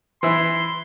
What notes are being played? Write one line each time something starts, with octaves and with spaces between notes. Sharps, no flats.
E3 E4 C6